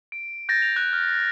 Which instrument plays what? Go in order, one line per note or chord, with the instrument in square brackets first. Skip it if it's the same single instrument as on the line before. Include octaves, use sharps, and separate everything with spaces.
[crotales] D7
G6 A6 A#6
F7
F#6
F6